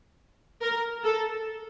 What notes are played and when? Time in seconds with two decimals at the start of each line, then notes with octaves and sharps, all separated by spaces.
0.62 A#4
1.04 A4